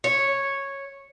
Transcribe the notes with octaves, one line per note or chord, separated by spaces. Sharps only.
C#5